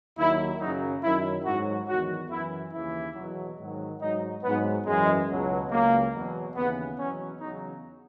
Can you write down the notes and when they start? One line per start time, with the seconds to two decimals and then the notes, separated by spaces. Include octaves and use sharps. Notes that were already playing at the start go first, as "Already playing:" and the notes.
0.18 D#2 D#3 F#3 E4
0.60 F#2 C#3 F#3 D#4
1.03 F#2 D#3 F#3 E4
1.46 G#2 F#3 F#4
1.88 E2 D#3 F#3 F#4
2.31 F#2 E3 E4
2.73 D#2 C#3 E3 E4
3.16 E2 B2 F#3
3.59 G#2 D#3 F#3
4.00 G#2 F#3 D#4
4.44 G#2 F#3 B3
4.86 F#2 E3 G#3
5.29 C#2 B2 F#3
5.71 C#2 C#3 F#3 A#3
6.13 E2 B2 F#3
6.56 D#2 C#3 E3 B3
6.98 E2 B2 F#3 C#4
7.41 E2 C#3 F#3 D#4